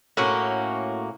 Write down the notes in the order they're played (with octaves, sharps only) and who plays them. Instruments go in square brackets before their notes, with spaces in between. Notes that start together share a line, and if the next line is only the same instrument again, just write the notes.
[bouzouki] A2 A#3 C#4 F#4